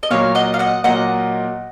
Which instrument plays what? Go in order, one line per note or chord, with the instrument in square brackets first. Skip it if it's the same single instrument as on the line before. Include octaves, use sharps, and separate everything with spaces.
[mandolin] D#5
[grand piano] A#2 F#3 A#3 [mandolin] C#5 F5
[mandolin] D#5 F#5
F5
D#5 F#5
[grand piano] A#2 F#3 A#3 [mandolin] D#5 F#5